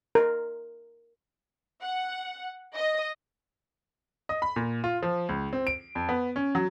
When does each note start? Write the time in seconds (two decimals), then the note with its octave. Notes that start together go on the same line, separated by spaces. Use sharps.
0.15 A#4
1.82 F#5
2.76 D#5
4.29 D#5
4.42 B5
4.56 A#2
4.84 F4
5.03 F3
5.29 C#2
5.53 C4
5.67 D7
5.95 F2
6.09 B3
6.36 C#4
6.55 F#3